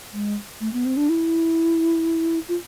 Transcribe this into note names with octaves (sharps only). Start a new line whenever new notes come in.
G#3
A3
B3
C4
D4
E4
F4